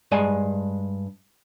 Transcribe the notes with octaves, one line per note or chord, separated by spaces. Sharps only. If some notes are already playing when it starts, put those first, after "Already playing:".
G2 G#3 G#5